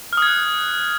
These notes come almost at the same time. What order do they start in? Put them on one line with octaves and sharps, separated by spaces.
F6 D#6 G#6 F#6